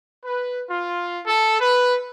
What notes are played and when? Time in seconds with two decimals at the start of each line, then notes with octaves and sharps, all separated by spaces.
0.24 B4
0.70 F4
1.27 A4
1.61 B4